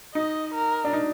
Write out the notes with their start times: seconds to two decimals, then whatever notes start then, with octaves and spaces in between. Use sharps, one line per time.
0.14 D#4 D#5
0.54 A#4
0.84 D4
0.93 D#4